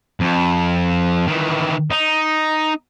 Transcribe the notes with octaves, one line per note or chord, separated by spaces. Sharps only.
F2
D#3 E3
D#4